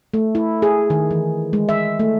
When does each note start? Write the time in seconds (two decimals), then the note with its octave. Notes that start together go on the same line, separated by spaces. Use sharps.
0.14 A3
0.35 E4
0.62 G#4
0.90 D#3
1.11 E3
1.53 G#3
1.69 E5
1.99 A3